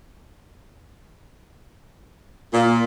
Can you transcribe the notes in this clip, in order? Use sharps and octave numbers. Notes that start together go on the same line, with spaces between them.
A#2